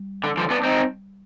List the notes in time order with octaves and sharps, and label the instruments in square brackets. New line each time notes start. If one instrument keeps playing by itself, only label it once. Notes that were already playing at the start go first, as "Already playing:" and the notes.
Already playing: [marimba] G3
[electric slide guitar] D3
D3 F3
B3 D4
C4 D#4